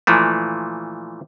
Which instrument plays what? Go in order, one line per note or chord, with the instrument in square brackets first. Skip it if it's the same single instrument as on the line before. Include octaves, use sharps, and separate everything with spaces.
[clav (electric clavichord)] A#2 E3 F3 A3